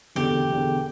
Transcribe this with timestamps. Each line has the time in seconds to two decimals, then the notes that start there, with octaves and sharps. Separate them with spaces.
0.15 E1 E2 D3 G4
0.49 E1 E2 D3